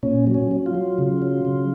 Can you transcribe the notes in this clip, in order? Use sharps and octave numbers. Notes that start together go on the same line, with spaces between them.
A#2 C#4
F#3
C#4
F#3
F4
F#3
C#3
F#3
C#3